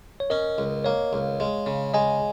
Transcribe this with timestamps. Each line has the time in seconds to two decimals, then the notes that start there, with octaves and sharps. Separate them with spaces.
0.20 C#5
0.30 C#4 A#4 D#5
0.58 C#2
0.85 A#3 C#5 F5
1.13 C#2
1.40 G#3
1.66 C#3
1.94 G#3 D#5 G#5